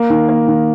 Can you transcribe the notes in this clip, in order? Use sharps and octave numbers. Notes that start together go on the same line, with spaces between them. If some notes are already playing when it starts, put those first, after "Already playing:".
Already playing: A#3
D#3
A#3
D#3